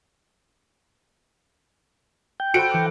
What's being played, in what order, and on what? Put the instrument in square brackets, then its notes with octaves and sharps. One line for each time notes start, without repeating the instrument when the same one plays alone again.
[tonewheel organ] G5
[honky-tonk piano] F#4 C#7 D7 [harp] A4 C5 B5
[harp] E3 D6 F6